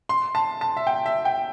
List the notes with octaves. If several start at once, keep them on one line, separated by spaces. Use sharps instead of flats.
C6
A5
A5
E5
G5
E5
G5